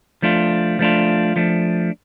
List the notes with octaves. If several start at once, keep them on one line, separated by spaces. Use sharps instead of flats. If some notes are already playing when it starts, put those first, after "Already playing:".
F3 A3 D4 F4
F3 A3 D4 F4
F3 A3 D4